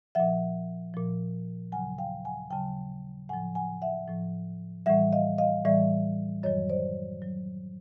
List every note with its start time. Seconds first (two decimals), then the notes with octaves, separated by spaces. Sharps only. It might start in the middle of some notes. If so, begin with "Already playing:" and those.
0.15 A#2 F3 E5 F#5
0.94 A#2 F3
1.72 D#2 C#3 F#3 F#5 G#5
1.98 F5 G5
2.25 F#5 G#5
2.51 D#2 C#3 F#3 G5 A5
3.29 A2 F3 F#5 G#5
3.55 F#5 G#5
3.82 E5 F#5
4.08 A2 F3
4.86 A2 E3 G3 E5 F#5
5.13 D#5 F5
5.38 D#5 F5
5.65 A2 E3 G3 D5 E5
6.43 F#2 D#3 F#3 C#5 D#5
6.69 C5 D5
7.22 F#2 D#3 F#3